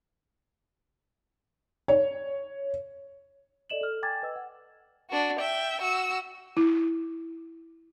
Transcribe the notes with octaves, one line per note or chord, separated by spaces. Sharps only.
C#5
A4 D5 D#5 E7 F#7
A4 F6
G5 G#5 A#5 D6 G#6 A6
B4 D#5 E6
F#5
D4 F#4
E5 G5
F#4 E6
E4